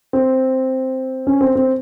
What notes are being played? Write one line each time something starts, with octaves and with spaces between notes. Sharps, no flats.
C4
C#4
C4
C4